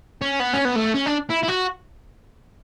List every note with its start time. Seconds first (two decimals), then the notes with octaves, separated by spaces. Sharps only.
0.21 C#4
0.40 B3
0.53 C#4
0.65 B3
0.76 A3
0.94 C#4
1.06 D4
1.30 E4
1.43 E4
1.48 F#4